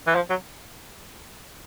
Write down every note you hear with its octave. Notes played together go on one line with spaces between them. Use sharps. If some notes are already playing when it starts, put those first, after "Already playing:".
E3
F3
F#3